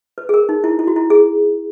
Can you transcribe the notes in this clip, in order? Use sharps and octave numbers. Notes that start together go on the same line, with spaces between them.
B4
G#4
A#4
D#4
E4
E4
F#4
E4
G#4